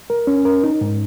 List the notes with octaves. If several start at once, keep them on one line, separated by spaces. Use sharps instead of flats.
A#4
C#4
A#4
D#4
G#2